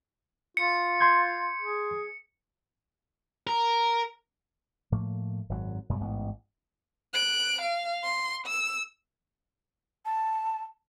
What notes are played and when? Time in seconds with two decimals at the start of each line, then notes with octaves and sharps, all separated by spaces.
0.57 F4 C#7
1.00 C6 G6 G#6
1.60 G#4
3.47 A#4
4.92 A2 F3 A3 A#3
5.49 G#1 F#2 C#3 F#3
5.89 F#2 B2 G3 G#3
6.01 A1 G#2 B3
7.13 F#6 D7
7.61 F5
8.03 C6
8.47 E6
10.06 A5